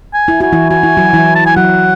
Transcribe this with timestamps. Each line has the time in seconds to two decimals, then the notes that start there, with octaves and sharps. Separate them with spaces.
0.14 G#5
0.28 E4
0.41 F#4 G#5
0.52 E3 E4
0.70 F#4 G#5
0.83 E4
0.97 F#3 F#4
1.13 E3 E4
1.35 A5
1.46 G#5
1.56 F#3 F#4 F#5